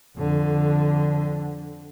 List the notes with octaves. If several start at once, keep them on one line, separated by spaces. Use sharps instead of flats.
F2 D3